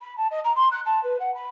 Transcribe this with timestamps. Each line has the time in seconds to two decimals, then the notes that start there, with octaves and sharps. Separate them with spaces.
0.01 B5
0.17 A5
0.31 D#5
0.44 A#5
0.56 C6
0.72 F#6
0.86 A5
1.03 B4
1.20 F#5
1.34 B5